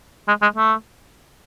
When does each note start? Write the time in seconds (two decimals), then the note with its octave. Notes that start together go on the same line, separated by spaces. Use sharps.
0.28 G#3
0.42 G#3
0.56 A3